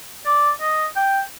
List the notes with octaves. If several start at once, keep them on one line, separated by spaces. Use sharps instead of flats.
D5
D#5
G5